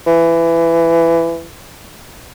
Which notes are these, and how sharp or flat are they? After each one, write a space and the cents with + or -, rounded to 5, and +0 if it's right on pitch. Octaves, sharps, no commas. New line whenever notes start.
E3 +20